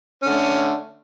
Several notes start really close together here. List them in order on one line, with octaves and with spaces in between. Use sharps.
C#4 D3 A3